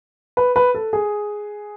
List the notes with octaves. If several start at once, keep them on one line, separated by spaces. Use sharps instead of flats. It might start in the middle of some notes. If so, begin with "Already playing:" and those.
B4
B4
A4
G#4